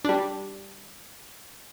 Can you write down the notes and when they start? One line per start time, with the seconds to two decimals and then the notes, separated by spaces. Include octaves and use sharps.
0.05 G3 D4